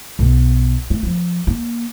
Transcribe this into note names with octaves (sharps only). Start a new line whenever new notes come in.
B1 B3
A3
E3 F3
A#3